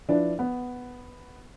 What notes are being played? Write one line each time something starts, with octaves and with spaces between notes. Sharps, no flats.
F3 D4 E4 B4
B3